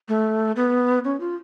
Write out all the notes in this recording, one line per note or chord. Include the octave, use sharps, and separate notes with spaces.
A3
B3
C#4
F4